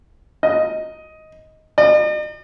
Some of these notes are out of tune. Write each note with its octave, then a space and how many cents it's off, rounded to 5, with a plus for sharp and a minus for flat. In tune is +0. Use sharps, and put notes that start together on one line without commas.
D#5 +10
D#5 -45